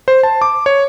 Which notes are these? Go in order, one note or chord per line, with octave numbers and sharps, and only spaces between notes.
C5
A5
D6
C#5